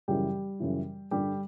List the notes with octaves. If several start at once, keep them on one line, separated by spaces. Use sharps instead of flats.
F#2 C#3 E3 G3 G4
F#2 C#3 E3
G2 D3 G3 G4